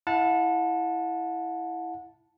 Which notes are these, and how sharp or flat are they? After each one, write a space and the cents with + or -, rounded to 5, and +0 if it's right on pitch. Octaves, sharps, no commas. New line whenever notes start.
E4 +0 F#5 -30 A5 +0